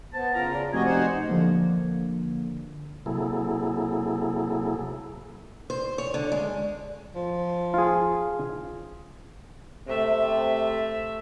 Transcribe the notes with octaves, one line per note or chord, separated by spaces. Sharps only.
B3 C5 A5
C#3 F4 A#4 A#5
D5
F1 F#4 G4 D#5 G#5
D#4 C5 F#5
D3 F3 A#3
C3 F#3 A#3 E4 G#4 A4
C5
C#5
D3
G#3
F3
F4 G#4
C3 A3 E5